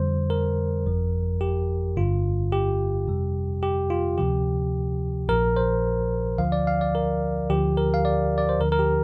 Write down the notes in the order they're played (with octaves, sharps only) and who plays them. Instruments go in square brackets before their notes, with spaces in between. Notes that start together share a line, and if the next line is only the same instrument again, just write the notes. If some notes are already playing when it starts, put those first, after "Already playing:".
Already playing: [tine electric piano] F2 D3 G3 C5
A#4
G1 F2 F3
G4
G1 G2 D3 F4
G4
F2 C3 G3
G4
F4
D2 C3 F3 G4
A#1 A#2 F3 A#4
C5
D2 D3 F3 F5
D5
F5
D5
A#4
D2 D3 F3 G4
A#4
F5
D5
D5
C5
D2 D3 F3 A#4
A#4
G4